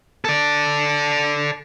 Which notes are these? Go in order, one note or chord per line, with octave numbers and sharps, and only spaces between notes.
A4 D5